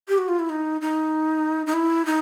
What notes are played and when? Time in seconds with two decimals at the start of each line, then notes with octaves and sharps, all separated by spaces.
0.09 G4
0.18 F#4
0.28 F4
0.39 E4
0.50 D#4
0.81 D#4
1.66 D#4
1.74 E4
2.06 D#4